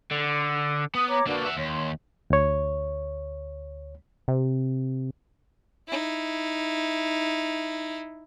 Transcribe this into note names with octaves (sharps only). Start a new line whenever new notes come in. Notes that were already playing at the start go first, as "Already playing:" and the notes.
D3
B3 D#6
C#5 A#5 D6
D3 A#3 D4 F#4 B4
E5 F#5
D#2 C#5 C6
D2 C#5
C3
D#4 E4